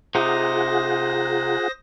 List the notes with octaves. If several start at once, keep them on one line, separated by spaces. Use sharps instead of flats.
C3 D#4 F4 G#4 C5 F#5 D#6 A#6